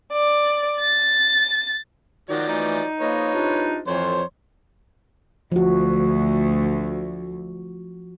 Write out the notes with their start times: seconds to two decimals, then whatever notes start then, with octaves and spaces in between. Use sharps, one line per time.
0.13 D5
0.81 A6
2.30 D#3 F3 F#3 F#4 D5
2.48 E3 A3 D#4
3.00 F2 A#3 B4 C#5 D#5
3.33 C3 D4 F4
3.87 F2 A2 E3 F4 C5 C#5
5.52 D2 F3 F#4